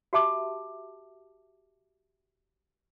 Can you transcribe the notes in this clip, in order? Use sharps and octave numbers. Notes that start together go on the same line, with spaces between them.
F#4 G4 E5 A5 D6